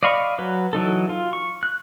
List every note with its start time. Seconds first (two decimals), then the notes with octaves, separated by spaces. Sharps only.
0.03 D5 D#5 F5 B5 C#6
0.38 F#3 B4
0.73 E3 F#3 D#4 A4
1.09 F4
1.33 C#6
1.63 F#6